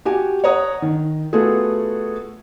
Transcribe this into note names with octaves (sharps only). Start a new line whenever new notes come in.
F#4 G4 G#5
C#5 F#5 A#5 D#6
D#3
A3 B3 F4 F#4 G#4 A4